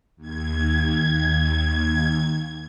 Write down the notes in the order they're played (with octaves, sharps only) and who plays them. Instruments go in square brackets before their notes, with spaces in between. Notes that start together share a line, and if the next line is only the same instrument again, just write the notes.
[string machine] D#2 G#6